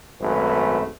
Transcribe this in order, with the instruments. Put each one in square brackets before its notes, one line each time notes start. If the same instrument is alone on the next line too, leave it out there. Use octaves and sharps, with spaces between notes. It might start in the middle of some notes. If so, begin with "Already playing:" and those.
[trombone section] G#1 F#2 A3 B4